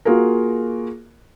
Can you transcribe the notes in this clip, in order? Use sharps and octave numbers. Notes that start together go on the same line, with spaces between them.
A#3 F4 F#4 G#4 A#4